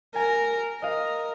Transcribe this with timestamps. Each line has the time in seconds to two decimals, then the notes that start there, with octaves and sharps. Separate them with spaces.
0.15 A#4 G#5
0.82 A#4 D#5 F5